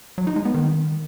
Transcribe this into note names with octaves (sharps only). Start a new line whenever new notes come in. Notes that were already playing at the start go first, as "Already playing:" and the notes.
F#3
D#4
G#3
B3
D#3